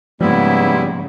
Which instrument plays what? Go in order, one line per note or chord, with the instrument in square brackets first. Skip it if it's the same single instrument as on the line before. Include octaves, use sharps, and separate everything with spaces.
[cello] G#2 C#3 [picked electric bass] F3 A#3 [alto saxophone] G3 [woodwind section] B3 E4